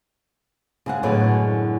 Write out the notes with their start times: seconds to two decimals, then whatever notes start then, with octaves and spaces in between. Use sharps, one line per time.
0.86 C#3 G#3 F#5
1.03 F#2 A2 D3 F#3 G#3 B3